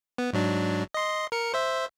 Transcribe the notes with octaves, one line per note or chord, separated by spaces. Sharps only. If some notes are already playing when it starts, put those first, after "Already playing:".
B3
G#2 F#3 D4
D#5 C6
A#4 C#7
C5 E5